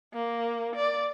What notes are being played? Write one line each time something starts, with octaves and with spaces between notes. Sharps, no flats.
A#3
D5